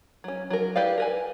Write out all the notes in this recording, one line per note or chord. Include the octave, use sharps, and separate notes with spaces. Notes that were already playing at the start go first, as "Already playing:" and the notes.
F#3 C#4
F#3 A#4
E4 G4 B4 D5 F5
A#4 B4 G#5